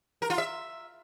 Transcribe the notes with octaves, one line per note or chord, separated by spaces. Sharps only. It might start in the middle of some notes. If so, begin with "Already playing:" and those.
A#4
F4
E5